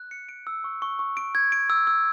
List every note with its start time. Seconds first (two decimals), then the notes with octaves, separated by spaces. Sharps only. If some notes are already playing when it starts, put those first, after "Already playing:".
Already playing: F#6
0.11 C#7
0.29 D7
0.47 E6
0.64 C#6
0.82 C#6
0.99 C#6
1.17 D7
1.35 G#6
1.52 D7
1.70 E6
1.87 E6